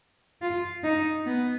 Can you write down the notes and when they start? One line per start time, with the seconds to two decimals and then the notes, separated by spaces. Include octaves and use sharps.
0.42 F4
0.84 D#4
1.26 B3